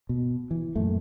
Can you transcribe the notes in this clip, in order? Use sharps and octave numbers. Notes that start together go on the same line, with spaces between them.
B2
E3
F#2 A#2 A3